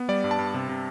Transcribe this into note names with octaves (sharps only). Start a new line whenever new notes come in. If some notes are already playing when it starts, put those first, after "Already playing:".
Already playing: B3
G3 D5
G2
A5
G2
C3
C3